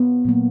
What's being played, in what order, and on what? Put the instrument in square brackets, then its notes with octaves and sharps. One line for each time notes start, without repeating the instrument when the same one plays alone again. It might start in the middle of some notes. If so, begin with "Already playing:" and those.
Already playing: [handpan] B3
A#2 F#3 A#3